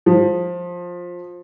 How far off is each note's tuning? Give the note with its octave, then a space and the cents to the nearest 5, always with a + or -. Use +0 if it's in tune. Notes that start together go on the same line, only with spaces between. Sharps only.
F3 +15